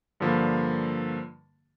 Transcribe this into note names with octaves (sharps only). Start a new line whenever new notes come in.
G2 D3 F3 A#3